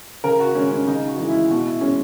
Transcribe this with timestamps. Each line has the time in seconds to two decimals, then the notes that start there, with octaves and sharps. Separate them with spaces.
0.24 C#3 A#4
0.40 F#4
0.55 G#3 C#4
0.71 C#4
0.87 C#3 D#4
1.08 F#4
1.18 E3 G#3
1.28 E4
1.50 B2 F#4
1.65 E4
1.81 G#3 C#4